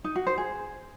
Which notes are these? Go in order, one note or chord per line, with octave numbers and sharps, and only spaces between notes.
D#4
F#4
C5
G#4